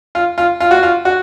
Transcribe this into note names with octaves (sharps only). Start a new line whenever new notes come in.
F4
F4
F4
F#4
F4
F#4